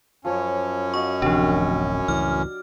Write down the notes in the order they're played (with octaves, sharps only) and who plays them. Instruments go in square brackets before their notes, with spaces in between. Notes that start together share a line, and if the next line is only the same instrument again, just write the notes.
[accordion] F#2 C#4 [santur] F3 C#5
[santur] F#4 D#5 F5 [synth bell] C#6
[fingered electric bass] D1 A1 C3 [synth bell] F3 D4 [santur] F#4 G4
[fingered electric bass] C#2 A2 E3 [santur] D5 [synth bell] F6